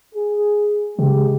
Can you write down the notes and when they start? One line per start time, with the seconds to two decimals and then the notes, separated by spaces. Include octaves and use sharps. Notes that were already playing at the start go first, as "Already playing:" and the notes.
0.15 G#4
0.99 C#3 G#3 G4